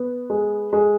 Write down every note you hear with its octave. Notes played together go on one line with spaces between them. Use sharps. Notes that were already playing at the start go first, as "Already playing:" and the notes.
Already playing: B3
G#3
G#3